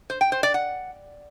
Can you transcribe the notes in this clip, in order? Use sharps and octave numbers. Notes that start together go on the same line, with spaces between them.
C5
G5
C5
D5
F#5